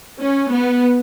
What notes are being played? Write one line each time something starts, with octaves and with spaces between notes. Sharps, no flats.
C#4
B3